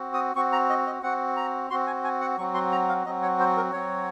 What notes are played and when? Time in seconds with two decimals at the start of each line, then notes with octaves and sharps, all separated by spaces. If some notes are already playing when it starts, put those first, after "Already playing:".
Already playing: C4 F#4
0.14 D#6
0.35 C4 F#4 C#6
0.52 A#5
0.69 D#5
0.86 D#5
1.03 C4 F#4 F#5
1.37 A#5
1.70 C4 F#4 C6
1.87 G#5
2.04 G#5
2.21 F#5
2.37 F#3 C4 F#4 C#6
2.54 C6
2.72 A#5
2.89 F5
3.06 F#3 C4 F#4 D#5
3.22 C#5
3.40 C5
3.57 A#4
3.73 F#3 C4 F#4 C#5